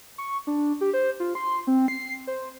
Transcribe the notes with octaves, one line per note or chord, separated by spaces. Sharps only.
C#6
D4
G4
C5
F4
C6
C4
C7
C5